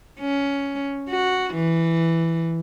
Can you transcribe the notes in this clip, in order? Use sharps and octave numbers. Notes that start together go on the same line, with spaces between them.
C#4
F#4
E3